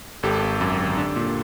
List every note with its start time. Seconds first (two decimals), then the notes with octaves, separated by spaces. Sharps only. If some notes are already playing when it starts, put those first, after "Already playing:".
0.23 G#1 G4 A4
0.42 G#1
0.61 F#2
0.79 D3
0.97 D4
1.16 A#2